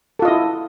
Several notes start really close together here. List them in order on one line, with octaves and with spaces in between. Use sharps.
A4 F4 D#5 E4